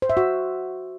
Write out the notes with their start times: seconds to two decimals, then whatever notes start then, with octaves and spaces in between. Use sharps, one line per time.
0.02 C5
0.10 E5
0.17 F#4